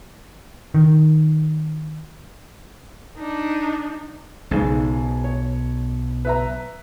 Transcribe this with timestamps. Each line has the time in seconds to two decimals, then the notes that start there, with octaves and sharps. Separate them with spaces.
0.75 D#3
3.17 D4 D#4
4.51 B1 G#2 C#3
5.24 C#5
6.25 B4 E5 A#5